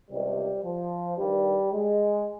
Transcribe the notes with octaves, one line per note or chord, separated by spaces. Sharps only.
C#2 C3 D#3 G3
F3
G2 D#3 G3
G#3